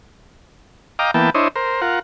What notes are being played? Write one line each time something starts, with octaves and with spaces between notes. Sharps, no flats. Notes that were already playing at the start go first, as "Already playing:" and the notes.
D#5 F5 G5 A#5 D6
E3 A#3 B3 G5 A5
D4 E4 C5 C#5 D#5
A#4 C5
F4 A#4 F#5